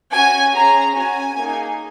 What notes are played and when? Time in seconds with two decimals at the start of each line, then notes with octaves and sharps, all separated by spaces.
0.13 C#4 F#4 G#5
0.54 C#4 G#4 A#5
0.95 C#4 F#4 G#5
1.37 A#3 D#4 G#4